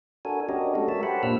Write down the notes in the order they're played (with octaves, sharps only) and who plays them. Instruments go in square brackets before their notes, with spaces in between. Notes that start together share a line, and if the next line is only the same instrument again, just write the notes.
[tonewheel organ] D4 F#4 A4 A#4 G#5
C#4 D4 F#4 G4 A#4 D#5
G#3 A3 D4 F#4 A4
A#4 C#5 E5 A5
G4 C5 F#5 B5
A#2 A#3 D4 F4 E6 F6